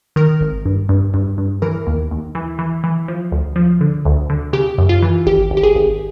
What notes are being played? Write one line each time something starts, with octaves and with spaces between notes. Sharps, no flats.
D#3 A#4
G#1
G2
G2
G2
G2
E3 A#4
D#2
D#2
E3
E3
E3
F3
D2
F3
D3
D2
D3
C#3 G4
F#2
F4
E3
G#1 G4
G#1
G4
G#4
G#1